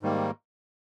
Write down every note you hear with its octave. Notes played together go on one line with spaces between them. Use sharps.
G#2 D#3 G3 A#3